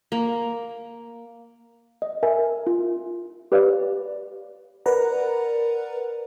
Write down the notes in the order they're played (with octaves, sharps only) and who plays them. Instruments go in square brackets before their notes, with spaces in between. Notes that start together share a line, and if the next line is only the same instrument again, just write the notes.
[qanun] A#3
[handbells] D#5
A#4 E5 G#5
F4
G4 B4 C#5 D5 F5
[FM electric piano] A#4 B4 D5 F#5 A#5